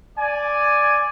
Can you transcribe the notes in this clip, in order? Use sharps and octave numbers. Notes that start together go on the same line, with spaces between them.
D5 G#5